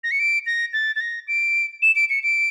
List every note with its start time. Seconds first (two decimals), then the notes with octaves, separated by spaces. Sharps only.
0.04 A#6
0.11 C#7
0.20 D7
0.46 A#6
0.73 A6
0.96 A6
1.01 A#6
1.28 D7
1.82 E7
1.96 D7
2.10 C#7
2.23 D7